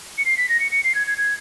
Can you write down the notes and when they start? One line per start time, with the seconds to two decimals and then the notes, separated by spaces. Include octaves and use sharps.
0.18 C#7
0.25 C7
0.37 B6
0.49 A#6
0.60 C#7
0.71 C#7
0.84 C7
0.95 G#6
1.07 G#6
1.18 G#6